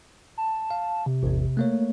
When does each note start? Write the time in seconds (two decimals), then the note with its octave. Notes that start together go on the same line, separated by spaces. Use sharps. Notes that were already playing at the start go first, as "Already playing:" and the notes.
0.38 A5
0.71 F5
1.06 C3
1.23 A1 E2
1.57 A3 A#3 C#5